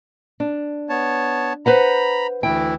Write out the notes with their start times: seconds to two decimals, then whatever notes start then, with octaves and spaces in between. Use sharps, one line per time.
0.40 D4
0.89 B3 C#5 A5
1.66 B4 C5 F#5 A#5 B5
2.43 D2 E3 E4 G5